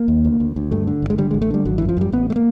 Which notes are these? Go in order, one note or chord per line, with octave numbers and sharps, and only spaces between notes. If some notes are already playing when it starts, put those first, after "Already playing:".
Already playing: A#3
D#2
D2
D2
D2
G2 A3
D3
G1
G#3
D3 G3
A1 G#3
A3
D3 G3
G#1 F#3
E3
F#2
F3
F#2 G3
A1 B3
A3
A#3